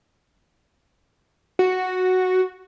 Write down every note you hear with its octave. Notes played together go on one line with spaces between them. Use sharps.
F#4